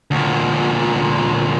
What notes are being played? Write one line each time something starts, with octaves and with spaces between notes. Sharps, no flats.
D2 A#2